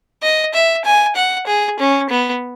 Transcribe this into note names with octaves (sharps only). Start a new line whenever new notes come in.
D#5
E5
G#5
F#5
G#4
C#4
B3